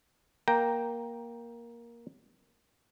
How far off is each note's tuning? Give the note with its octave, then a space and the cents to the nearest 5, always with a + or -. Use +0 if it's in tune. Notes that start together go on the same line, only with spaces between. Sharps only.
A#3 +10 G5 +0 A#5 +0